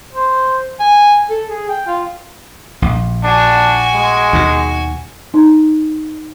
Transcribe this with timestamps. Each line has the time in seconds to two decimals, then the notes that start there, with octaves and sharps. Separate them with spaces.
0.13 C5
0.80 G#5
1.30 A4
1.48 G#4
1.69 G5
1.87 F4
2.82 A#1
3.24 D4 F#4 G#5
3.95 G#3
4.33 D#2 B2
5.34 D#4